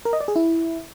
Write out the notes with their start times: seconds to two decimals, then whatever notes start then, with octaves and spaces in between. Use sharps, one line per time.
0.05 A#4
0.13 D#5
0.21 D5
0.28 G#4
0.36 E4